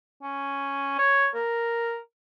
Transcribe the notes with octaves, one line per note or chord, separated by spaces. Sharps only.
C#4
C#5
A#4